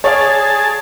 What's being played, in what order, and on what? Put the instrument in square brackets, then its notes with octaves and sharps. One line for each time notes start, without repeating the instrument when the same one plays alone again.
[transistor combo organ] G#4 A5 [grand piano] C#5 D5 F5